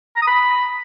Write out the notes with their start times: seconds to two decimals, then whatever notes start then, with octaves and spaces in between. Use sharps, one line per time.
0.16 A#5
0.22 D#6
0.27 B5